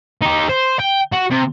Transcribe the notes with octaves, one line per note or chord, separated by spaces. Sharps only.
D#4 G4
C5
G5
F#4
C3